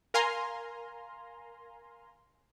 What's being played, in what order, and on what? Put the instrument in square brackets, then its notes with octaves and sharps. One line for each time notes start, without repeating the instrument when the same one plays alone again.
[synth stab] A#4 F5 G#5 A#5 C6